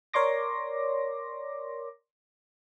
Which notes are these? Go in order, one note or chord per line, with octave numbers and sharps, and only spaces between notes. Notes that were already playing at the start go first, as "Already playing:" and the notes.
A#4 C#5 D5 C6 D6 A#6